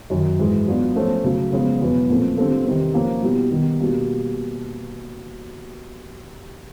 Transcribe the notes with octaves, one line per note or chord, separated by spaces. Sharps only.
F#2 D#3 F#3
G#2 E3 G#3
F#3 B3 D4 F4
F3 A3 C#4
C#3 F#3 A3
C#3 F3 G#3 B3
E2 B2 F#3 B3
A#2 F3 A3 C4
D3 G3 C4 F4 A4
E2 C3 D#3 G3 C4
F3 A#3 C#4 F4
B2 G3 B3 E4
D#3 G3 B3
B2 G3 A#3 D4